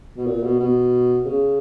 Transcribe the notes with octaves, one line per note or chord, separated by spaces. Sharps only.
B2
A#2
B2
B2
C#3